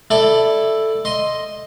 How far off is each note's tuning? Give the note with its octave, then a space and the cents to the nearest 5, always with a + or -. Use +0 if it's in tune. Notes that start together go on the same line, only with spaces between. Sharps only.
E4 +0 A4 +5 D5 +15
D#5 +0 C6 +0